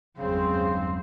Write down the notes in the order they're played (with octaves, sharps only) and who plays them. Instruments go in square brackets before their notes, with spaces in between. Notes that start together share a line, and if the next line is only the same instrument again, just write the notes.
[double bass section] G1 E2 [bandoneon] C#3 [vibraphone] F#3 G#3 [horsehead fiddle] C4 C5